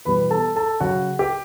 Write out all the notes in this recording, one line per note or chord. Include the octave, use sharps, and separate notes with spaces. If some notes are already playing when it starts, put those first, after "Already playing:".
E2 B2 G3 B4 B5
A4 A5
A4 A5
C#3 F#3 C#4 F#4 F#5
G4